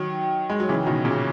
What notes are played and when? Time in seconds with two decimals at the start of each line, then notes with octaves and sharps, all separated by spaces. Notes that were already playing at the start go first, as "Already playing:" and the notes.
Already playing: D#3 F#3
0.50 G#3
0.60 F#3
0.69 C#3 E3
0.87 B2 D#3
1.05 A#2 C#3